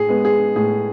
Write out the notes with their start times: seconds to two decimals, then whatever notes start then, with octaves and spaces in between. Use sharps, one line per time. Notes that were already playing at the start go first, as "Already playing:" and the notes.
Already playing: A2 G#4
0.09 G#3 B3
0.25 G#4
0.56 A2 G#4